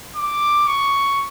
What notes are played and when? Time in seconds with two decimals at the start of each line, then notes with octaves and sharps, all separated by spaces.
0.16 D6
0.67 C#6